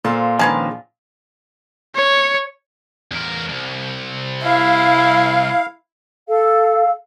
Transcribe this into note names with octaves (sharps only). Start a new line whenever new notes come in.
A#2 A4 C5 F5
D3 D#3 F3 G#3 C#4 G#4 B4 A5
C#5
E2 A#4
C2
E4 F5
A4 F5